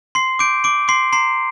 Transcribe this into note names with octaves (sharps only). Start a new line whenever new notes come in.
C6 C7
D6 G6 D7
C6 D6 D7
C6 D6 C7
A#5 C6 C7